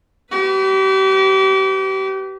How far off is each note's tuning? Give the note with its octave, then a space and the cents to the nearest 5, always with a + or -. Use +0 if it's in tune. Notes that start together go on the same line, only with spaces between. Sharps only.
G4 -35 B4 +15